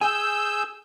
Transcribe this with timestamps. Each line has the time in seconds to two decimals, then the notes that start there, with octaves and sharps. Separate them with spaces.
0.01 G#4 G#5 E6 G6